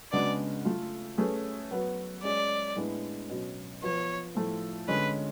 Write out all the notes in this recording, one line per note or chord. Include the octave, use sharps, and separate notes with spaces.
C#3 G#3 B3 D4 F#4 D5
A3 F4 A4
A3 C#4 G#4 B4
F#3 B3 F#4 B4
G#3 C#4 G#4 D5
A2 G#3 B3 D4
B2 F#3 C#4
F3 B3 F4 B4 C#5
A2 F3 A3 F4
D3 G#3 C#4 B4